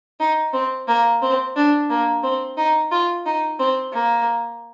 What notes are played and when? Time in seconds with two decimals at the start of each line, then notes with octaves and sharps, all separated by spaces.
0.20 D#4
0.54 C4
0.88 A#3
1.22 C4
1.56 D4
1.90 A#3
2.24 C4
2.57 D#4
2.91 F4
3.26 D#4
3.60 C4
3.93 A#3